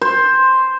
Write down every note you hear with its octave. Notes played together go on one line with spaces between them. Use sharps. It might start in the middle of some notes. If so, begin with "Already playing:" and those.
C5